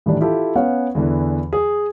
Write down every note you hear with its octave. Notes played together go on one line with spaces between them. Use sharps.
A2 D#3 E3 G3 D4
E4 F4 G4 A4
B3 C#4 C#5 F5 F#5
E2 D3 E3
G#4